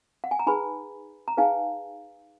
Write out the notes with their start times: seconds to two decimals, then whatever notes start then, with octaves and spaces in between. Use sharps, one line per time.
0.24 F#5
0.31 G#5
0.39 A#5
0.47 D#4 G#4 B4 G#5 B5
1.28 A#5
1.37 D#4 G#4 B4 F5 G#5